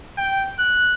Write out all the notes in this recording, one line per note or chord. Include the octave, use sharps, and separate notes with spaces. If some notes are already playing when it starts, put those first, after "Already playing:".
G5
F#6